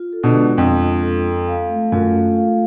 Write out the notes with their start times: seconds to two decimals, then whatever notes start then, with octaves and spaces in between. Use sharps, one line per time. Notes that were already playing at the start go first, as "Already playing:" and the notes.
Already playing: F4
0.13 A4
0.23 B2 D3
0.35 G#3
0.58 F2 D4
0.80 F4
1.02 A4
1.25 A4
1.47 F5
1.69 A3
1.92 F#2 F4
2.15 A4
2.37 F5